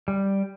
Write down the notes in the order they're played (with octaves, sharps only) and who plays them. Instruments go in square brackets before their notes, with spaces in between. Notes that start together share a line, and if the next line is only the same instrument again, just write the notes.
[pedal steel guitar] G3